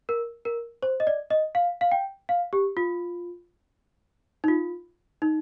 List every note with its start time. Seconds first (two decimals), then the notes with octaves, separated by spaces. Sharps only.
0.09 A#4
0.45 A#4
0.83 C5
1.00 D#5
1.07 D5
1.30 D#5
1.55 F5
1.81 F5
1.92 G5
2.29 F5
2.53 G4
2.77 F4
4.44 D#4
4.48 F4
5.22 D#4